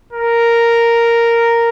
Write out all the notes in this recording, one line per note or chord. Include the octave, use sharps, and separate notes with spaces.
A#4